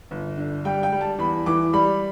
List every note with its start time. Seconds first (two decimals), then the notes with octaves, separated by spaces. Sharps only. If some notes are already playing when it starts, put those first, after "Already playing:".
0.11 G1
0.37 D3
0.65 G3 G5
0.83 G5
0.92 G3
1.01 A5
1.18 E2 B5
1.46 E3 D6
1.73 G3 B5